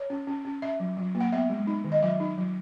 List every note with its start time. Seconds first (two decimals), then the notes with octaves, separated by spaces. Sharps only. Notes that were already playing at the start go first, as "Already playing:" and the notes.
Already playing: C#5
0.10 C#4
0.27 C#4
0.45 C#4
0.62 C#4 E5
0.80 F#3
0.97 F#3
1.15 A#3
1.20 F#5
1.32 B3 E5
1.50 G#3
1.67 D#4
1.84 D#3
1.92 D#5
2.02 F#3 E5
2.20 D#4
2.37 F#3